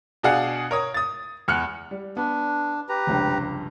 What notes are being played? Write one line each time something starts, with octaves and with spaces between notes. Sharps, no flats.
B2 D4 G#4 F5 F#5
A#4 C#5 D#6
D#6 A6
E2 F6 F#6 C#7
G3
B3 D4
G4 B4 A#5
F1 C#2 G2